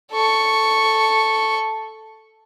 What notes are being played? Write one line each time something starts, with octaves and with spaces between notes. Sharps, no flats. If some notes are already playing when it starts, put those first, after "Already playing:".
A4 C#6